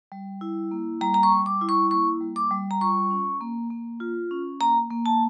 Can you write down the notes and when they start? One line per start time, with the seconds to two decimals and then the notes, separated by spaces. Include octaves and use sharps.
0.12 G3
0.41 E4
0.71 A#3
1.01 G3 A#5
1.14 A#5
1.23 C#6
1.31 G3
1.46 D6
1.61 E4
1.69 C#6
1.91 A#3 C#6
2.21 G3
2.36 D6
2.51 G3
2.71 A#5
2.81 F4 C#6
3.11 C#4
3.41 A#3
3.70 A#3
4.00 F4
4.31 C#4
4.61 A#3 A#5
4.91 A#3
5.06 A5